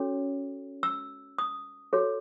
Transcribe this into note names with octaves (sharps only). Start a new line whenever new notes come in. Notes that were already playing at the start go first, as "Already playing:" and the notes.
Already playing: C#4 F#4 A4 C#5
E6
D#6
F#4 A4 C#5